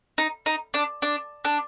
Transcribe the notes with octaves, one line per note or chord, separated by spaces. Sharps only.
D#4
D#4
D4
D4
D4